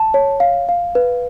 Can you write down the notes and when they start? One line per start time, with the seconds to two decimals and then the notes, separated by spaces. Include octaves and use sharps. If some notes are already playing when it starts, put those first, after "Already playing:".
Already playing: A5
0.14 C#5
0.40 F5
0.69 F5
0.95 B4